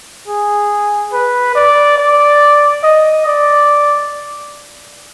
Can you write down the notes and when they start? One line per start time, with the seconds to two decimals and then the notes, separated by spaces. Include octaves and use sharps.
0.27 G#4
1.13 B4
1.55 D5
1.98 D5
2.83 D#5
3.26 D5